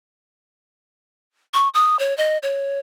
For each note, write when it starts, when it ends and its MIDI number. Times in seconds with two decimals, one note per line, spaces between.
1.54 1.69 85
1.74 1.99 87
1.99 2.16 73
2.17 2.38 75
2.43 2.79 73